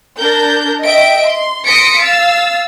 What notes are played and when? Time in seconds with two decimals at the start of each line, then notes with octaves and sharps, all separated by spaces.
0.17 D4 A#4 G6
0.84 D#5 E5 G5 D7
1.25 C6
1.65 C6 D#6 A#6 B6 C#7 D7
2.02 F5 E6 A6